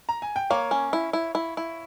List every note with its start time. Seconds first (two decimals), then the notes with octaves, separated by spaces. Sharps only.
0.09 A#5
0.22 G#5
0.36 G5
0.50 A#3 C#5 F5
0.71 C#4
0.93 E4
1.13 E4
1.35 E4
1.57 E4